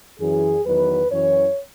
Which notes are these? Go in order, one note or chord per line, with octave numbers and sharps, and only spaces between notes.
F#2 E3 G#4
E2 D#3 F#3 B4
F#2 E3 C#5